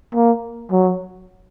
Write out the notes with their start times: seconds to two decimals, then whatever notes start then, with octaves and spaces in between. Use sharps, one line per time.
0.15 A#3
0.72 F#3